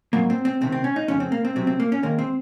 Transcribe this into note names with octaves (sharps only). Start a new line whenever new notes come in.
G#2 F#3 A#3
C4
C4
C2 C3 D#3 C4
C4
C#4
D#4
F2 C#3 G#3 C#4
C4
A#3
C4
C2 C3 F#3 C4
C4
A#3
C#4
D#2 D#3 G#3 A#3
C4